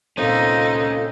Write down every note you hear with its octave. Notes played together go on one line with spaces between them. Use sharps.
A#2 C4 C#4 D#4 F4 A4